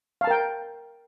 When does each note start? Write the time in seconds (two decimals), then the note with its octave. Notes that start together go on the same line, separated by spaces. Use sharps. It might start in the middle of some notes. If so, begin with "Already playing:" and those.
0.21 F5
0.24 A5
0.27 A#4
0.30 G5